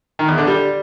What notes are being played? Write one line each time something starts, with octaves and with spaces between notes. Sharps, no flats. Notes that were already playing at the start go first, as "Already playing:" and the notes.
D#3
E2
D3
G3